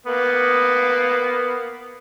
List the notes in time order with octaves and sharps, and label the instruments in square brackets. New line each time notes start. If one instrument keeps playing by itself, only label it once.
[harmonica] A#3 B3